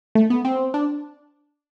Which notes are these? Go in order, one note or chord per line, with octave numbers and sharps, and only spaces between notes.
A3
B3
C4
D4